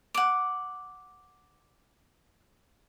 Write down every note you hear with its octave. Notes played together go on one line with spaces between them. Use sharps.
F#5 D6